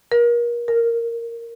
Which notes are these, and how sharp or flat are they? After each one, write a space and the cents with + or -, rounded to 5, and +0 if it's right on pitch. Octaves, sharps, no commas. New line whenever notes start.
A#4 +30
A#4 -5